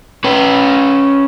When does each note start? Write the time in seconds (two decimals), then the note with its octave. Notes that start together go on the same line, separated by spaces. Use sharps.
0.24 C#4 B4